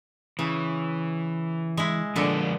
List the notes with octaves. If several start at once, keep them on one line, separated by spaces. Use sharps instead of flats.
C#3 E3
G#3 E4
A#2 D3 F3 G#3 B3 A4